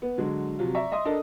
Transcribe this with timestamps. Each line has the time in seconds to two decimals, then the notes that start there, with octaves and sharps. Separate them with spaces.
0.02 B3
0.18 D3 F#3 G#3
0.59 C3 F3 F#3 F4
0.75 D5 E5 A#5 C#6
0.92 D#5 E5 C6 D#6
1.05 D4 A4 A#4 D#5